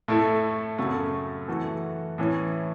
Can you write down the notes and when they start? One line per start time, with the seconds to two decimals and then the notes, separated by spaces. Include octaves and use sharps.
0.08 A2 A3 E4 A4
0.78 F#2 C#3 F#3 A3
1.48 E3 A3 F#4 A4
2.18 A2 E3 C#4